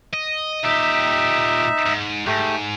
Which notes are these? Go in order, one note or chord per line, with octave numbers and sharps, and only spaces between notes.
D#5
A#2 D#4 G4 E5
G#2
G#2 A3 G4